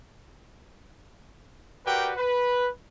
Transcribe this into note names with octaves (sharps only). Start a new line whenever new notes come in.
F#4 G4 A#4 B4 D5 G5
B4